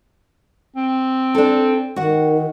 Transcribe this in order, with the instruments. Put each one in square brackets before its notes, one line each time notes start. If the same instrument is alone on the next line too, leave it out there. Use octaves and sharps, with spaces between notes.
[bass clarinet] C4
[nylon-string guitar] D4 A4
[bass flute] D#3 [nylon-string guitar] F#4 F#5